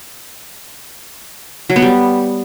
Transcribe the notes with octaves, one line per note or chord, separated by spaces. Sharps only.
F#3
B3
G3